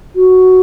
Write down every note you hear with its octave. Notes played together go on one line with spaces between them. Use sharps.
F#4